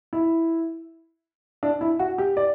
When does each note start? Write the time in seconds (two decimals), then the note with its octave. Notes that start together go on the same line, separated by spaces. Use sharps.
0.13 E4
1.63 D4
1.81 E4
1.99 F#4
2.18 G4
2.37 D5